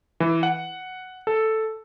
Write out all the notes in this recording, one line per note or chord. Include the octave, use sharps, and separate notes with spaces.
E3
F#5
A4